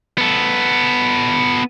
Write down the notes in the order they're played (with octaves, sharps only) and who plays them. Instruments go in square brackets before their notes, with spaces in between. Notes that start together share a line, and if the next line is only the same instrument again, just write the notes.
[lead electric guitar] B3 A4